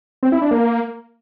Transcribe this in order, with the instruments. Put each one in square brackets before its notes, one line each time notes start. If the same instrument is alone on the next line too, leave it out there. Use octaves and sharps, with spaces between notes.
[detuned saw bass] C4
E4
D4
A#3